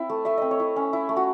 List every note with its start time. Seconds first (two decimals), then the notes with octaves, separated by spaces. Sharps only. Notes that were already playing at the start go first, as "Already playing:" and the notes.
Already playing: C4 E4
0.10 A3
0.25 A3 E5
0.38 C4 D#5
0.51 C#5
0.60 E4
0.76 C#4
0.93 E4
1.09 A3
1.17 F#4